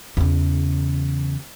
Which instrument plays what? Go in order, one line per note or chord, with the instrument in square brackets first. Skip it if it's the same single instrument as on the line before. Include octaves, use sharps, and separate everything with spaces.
[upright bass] E2 C#3